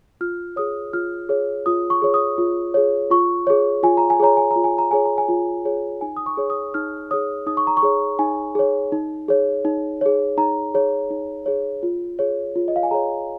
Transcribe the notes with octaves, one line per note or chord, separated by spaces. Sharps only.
F4 F6
G#4 C#5 D#6
F4 F6
G#4 C#5
F4 D#6
C#6
G#4 C#5
D#6
F4
G#4 C#5
F4 C#6
G#4 C#5
F4 G#5
A#5
G#5
G#4 C#5 A#5
G#5
A#5
F4
G#5
A#5
G#4 C#5 G#5
A#5
G#5
F4
G#4 C#5
D#4 G#5
D#6
C#6
G#4 C#5
D#6
D#4 F6
G#4 C#5 D#6
D#4 D#6
C#6
A#5
C#6
G#4 C#5
D#4 G#5
G#4 C#5
D#4
G#4 C#5
D#4
G#4 C#5
D#4 A#5
G#4 C#5
D#4
G#4 C#5
F4
G#4 C#5
F4
D#5
F5
G#5
G#4 C#5 A#5